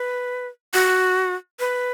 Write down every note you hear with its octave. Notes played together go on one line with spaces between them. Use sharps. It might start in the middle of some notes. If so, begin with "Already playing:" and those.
Already playing: B4
F#4
B4